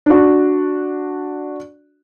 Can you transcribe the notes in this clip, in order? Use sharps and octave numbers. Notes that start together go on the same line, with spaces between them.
D4 F#4